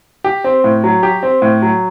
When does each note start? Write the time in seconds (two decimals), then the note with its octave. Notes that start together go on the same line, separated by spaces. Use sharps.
0.24 G4
0.44 C4
0.64 A2
0.84 F#3
1.03 G4
1.23 C4
1.42 A2
1.62 F#3